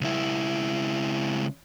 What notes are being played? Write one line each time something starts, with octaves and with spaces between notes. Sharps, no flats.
C#2 E4